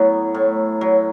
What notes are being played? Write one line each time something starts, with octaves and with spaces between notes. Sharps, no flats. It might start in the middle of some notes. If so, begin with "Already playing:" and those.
Already playing: A2 F#3 B3
A2
F#3